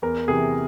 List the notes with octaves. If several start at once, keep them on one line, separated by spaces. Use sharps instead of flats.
E2 A#4
C3 E3 G#4